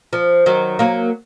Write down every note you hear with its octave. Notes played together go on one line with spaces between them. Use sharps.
F3
D#3 F#3
F#3 A#3